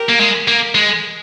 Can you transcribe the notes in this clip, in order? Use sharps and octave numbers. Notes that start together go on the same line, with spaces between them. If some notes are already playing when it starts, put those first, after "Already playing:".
Already playing: G4 A#4
A#3
G#3
A#3
G#3